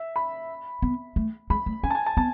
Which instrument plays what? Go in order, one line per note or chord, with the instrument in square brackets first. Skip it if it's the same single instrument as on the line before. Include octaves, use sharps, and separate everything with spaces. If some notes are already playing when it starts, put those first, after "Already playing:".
Already playing: [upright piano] E5
B5
[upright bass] B3
A3
[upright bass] G#3 [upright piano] B5
[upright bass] A3
[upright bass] C#4 [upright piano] G#5
[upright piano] A5
G#5
A5
[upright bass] B3 [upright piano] A5